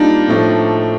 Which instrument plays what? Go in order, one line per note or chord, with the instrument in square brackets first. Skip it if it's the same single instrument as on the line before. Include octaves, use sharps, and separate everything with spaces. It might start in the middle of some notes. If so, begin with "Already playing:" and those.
Already playing: [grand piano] G3 A#3 F4 [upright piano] D4 D#4
[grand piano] A2 F3 A3 D4